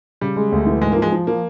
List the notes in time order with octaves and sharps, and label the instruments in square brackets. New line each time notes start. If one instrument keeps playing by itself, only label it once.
[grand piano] C#3 [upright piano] G3
[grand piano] G#3
D2
E3
[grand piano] G#2 [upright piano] G#3
[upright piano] A#3
[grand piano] F3
[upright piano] G#3
[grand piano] F3
[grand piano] F3 [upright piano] A#3